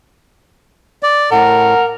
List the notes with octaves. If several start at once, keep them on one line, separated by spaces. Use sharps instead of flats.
D5
A2 A#4 F#5